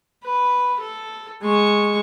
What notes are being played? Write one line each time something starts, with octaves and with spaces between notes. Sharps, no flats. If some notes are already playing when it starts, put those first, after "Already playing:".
B4
A4
G#3 C#6